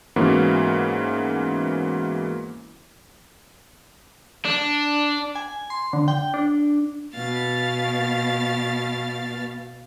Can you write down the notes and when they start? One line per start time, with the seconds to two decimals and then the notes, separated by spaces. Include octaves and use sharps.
0.16 G#2 E3 A#3 B3 C#4 F#4
4.45 D4
5.35 G#5
5.70 C6
5.93 D3
6.08 G5
6.34 D4
7.14 B2 F5 A6